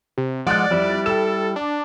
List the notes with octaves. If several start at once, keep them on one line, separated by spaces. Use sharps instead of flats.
C3
F3 G#3 D5 F#5 F6 F#6
F2 G3 E4
A4 G5 E7
D4